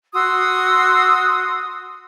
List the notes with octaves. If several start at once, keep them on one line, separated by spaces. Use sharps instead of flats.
F#4 C6 D#6 E6